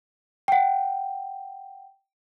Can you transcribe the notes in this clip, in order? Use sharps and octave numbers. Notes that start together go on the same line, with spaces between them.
F#5 G5